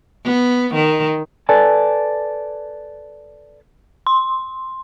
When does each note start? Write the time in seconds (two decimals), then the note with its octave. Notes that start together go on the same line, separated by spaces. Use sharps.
0.25 B3
0.74 D#3
1.49 A4 B4 D5 G#5 A5
4.07 C6